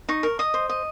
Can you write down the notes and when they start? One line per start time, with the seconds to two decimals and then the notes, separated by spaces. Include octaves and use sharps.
0.09 D#4 C#6
0.23 A#4
0.39 D#5 D#6
0.54 C5
0.69 D#5